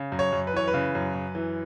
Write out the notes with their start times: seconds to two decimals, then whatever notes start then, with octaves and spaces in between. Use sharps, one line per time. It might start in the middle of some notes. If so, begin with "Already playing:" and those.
Already playing: C#3
0.12 F#2
0.19 C#5
0.32 F#2
0.47 B4
0.53 E3 C#5
0.68 B4
0.74 C#3
0.95 F#2
1.15 F#2
1.35 E3